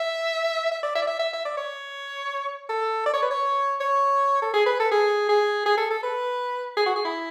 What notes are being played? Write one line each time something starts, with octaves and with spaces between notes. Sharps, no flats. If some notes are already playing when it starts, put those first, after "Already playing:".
Already playing: E5
E5
D5
E5
D5
E5
E5
E5
D5
C#5
A4
D5
C#5
B4
C#5
C#5
A4
G#4
B4
A4
G#4
G#4
G#4
A4
A4
B4
G#4
F#4
G#4
E4